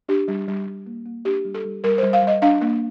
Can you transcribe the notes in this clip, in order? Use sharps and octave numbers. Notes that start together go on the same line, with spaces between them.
D4 G4
G3
G3
G3
A#3
A#3
D4 G4
G3
A4
G3
G3 A#4
C5
G3
F5
G3 D#5
D4 F5
A#3